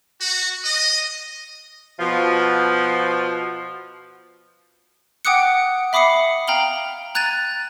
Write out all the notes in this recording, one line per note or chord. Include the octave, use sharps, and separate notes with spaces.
F#4
D#5
B2 F3
F#5 G5 D6 D#6 F#6 C#7
E5 B5 D6 D#6 C7 C#7
F5 G5 A#5 F6 F#7 G7
A#5 F#6 G#6 A6 D#7